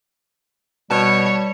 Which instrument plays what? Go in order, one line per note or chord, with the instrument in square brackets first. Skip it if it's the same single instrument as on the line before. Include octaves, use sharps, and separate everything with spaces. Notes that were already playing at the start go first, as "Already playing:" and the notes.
[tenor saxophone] B2 [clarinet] G3 [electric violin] C#5 [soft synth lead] A5